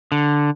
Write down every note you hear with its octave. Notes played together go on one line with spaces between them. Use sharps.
D3